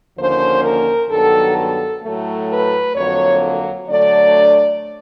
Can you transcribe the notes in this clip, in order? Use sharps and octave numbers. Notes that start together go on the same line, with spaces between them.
D#2 D3 F3 A#3 C#4 C5
A#4
G2 D#3 F#3 B3 A4
A4
A2 F#3 A3
B4
F2 D3 F#3 A#3 C#5
D3 F#3 A3 D4 D5